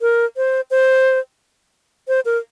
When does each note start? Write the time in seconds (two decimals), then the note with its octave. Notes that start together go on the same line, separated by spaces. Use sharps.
0.01 A#4
0.37 C5
0.71 C5
2.08 C5
2.25 A#4